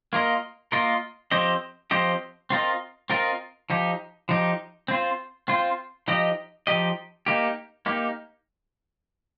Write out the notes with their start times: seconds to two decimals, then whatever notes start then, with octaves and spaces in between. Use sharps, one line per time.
0.13 A#3 F4 A#4 D#5
0.72 A#3 F4 A#4 D#5
1.31 F3 C4 G4 C5 D#5
1.91 F3 C4 G4 C5 D#5
2.50 C4 F4 A#4 D#5
3.10 C4 F4 A#4 D#5
3.70 F3 D#4 G4
4.29 F3 D#4 G4
4.88 C4 F4 C5
5.48 C4 F4 C5
6.08 F3 D#4 G4 D#5
6.67 F3 D#4 G4 D#5
7.26 A#3 D#4 G4
7.86 A#3 D#4 G4